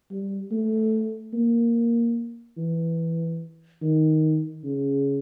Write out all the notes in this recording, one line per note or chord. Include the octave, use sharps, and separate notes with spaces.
G3
A3
A#3
E3
D#3
C#3